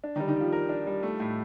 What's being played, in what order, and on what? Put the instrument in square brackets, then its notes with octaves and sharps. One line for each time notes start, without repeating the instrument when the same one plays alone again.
[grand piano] D4
[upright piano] D#3 D#4
[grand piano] G3
[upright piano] D#3 D#4
[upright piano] F3 F4 [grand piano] G4
[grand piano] A#4
D4
G3
A3
A2